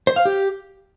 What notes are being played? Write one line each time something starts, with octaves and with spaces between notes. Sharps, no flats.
C5
F5
G4